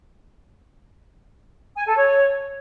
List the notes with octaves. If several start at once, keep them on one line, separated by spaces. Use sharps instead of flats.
G#5
A4
C#5